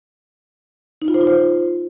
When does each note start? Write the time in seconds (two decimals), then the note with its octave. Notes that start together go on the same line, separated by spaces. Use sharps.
1.02 D#4
1.08 F4
1.14 C5
1.21 F4
1.27 C5